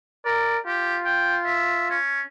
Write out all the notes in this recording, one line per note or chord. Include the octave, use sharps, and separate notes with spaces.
A#4 D5
F4 G4
G5
E5
C#4